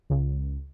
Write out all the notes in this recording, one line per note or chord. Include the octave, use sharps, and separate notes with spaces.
C#2